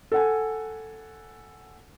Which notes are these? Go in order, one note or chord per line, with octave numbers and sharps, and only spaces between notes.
A4 F#5 G#5